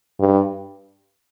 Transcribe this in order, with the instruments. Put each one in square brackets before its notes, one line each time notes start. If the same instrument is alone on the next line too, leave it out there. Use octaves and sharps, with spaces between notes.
[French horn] G2